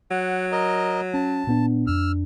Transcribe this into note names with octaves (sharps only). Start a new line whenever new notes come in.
F#3 F#5
A#4 D#5
C#4 A5
A#2 B3 D4
F2 D4 E6 F6